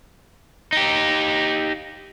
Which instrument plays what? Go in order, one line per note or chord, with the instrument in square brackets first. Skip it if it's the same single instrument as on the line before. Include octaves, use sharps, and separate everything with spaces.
[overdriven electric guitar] D#4 G4